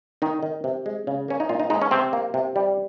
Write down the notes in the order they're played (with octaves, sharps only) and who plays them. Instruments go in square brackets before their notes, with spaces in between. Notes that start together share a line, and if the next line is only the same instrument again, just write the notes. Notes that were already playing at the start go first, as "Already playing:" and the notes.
[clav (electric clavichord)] D#3 D#4
D#3
C3
G#3
C#3
A#3 C#4
D#4
A#2 F4
D#4
G#3 D#4
C#4
C3 C4
A#3
C3
G3